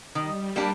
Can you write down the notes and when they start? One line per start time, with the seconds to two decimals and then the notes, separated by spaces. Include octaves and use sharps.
0.15 D#3 G3
0.56 G3 A#3 D4 G4